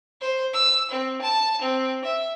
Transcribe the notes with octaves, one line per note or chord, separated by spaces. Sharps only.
C5
E6
C4
A5
C4
E5